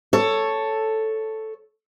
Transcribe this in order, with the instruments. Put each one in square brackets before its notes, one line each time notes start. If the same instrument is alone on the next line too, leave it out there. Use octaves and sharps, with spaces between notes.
[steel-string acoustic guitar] A4 C#5